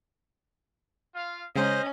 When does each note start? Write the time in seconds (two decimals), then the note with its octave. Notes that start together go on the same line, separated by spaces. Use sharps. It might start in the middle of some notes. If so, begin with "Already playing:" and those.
1.15 F4 F5
1.56 C#3 G#3 C#4 C5 D#5 A#5